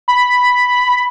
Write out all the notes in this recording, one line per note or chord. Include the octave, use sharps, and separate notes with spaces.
B5